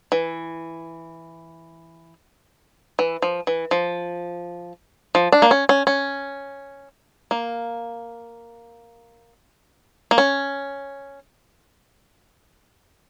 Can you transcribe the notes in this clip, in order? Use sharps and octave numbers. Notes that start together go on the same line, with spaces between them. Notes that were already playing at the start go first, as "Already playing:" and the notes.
E3
E3
F3
E3
F3
F3
D4
A#3
C#4
C#4
C#4
A#3
A#3
C#4